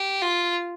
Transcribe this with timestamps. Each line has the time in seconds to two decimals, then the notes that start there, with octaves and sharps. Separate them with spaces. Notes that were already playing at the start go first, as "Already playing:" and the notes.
Already playing: G4
0.22 F4